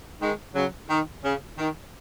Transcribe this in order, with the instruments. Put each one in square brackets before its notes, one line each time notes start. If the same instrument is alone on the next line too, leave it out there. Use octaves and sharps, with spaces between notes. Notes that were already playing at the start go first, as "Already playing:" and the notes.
[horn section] D#3 G#3
C#3 F#3
D#3
C#3
D#3